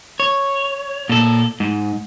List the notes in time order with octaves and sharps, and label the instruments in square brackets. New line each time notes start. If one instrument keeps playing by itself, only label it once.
[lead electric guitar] C#5
A#2 A4
G#2